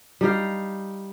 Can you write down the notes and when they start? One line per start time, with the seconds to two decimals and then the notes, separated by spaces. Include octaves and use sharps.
0.21 G3 D#4 G4 F5